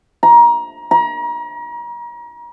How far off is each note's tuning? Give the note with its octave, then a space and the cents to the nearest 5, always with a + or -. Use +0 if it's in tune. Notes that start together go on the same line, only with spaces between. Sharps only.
A#5 +25
A#5 +35